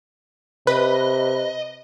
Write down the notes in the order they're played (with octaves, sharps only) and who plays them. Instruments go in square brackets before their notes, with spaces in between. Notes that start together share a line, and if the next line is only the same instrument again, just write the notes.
[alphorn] C3 [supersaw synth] B4 [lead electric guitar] D#5